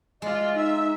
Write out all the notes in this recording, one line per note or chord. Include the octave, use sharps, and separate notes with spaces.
G#3 F4 D5 D#5
D#4 E5